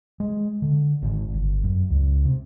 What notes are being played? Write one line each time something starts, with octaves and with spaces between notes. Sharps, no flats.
G#3
D3
G#1
G1
F#2
C#2
C3